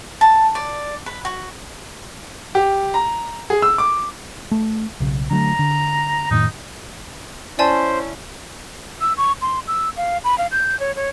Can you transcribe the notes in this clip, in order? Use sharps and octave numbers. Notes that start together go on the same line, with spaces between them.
A5
D5
B4
F#4
G4
A#5
G#4
E6
D6
A3
B1 C#3
D3 F#3 A3 A#5
D3
F2 A2 D#3 D#4
C#4 E4 C5 D5 G#5 A5
E6
C#6
C6
E6
F5
B5
F5
G6
C#5
C#5